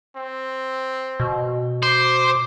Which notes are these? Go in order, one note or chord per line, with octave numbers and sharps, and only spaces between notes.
C4
B2
C5 D6